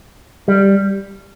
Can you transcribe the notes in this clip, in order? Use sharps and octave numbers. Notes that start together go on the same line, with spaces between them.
G3